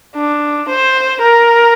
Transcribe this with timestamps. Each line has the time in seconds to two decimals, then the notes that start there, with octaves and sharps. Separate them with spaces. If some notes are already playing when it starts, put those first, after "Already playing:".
0.16 D4
0.68 C5
1.22 A#4